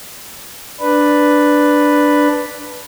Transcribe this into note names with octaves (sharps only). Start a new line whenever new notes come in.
D4 B4